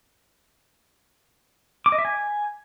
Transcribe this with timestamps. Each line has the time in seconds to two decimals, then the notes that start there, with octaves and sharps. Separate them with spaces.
1.86 D6
1.92 D#5
1.98 E5
2.05 G#5